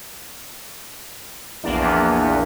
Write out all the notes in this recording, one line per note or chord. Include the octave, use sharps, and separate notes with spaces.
A#1 E2 A#3 D4